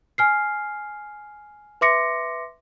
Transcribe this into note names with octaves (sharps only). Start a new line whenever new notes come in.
G#5 F6 C7
B4 E5 C6 D6 A#6 C#7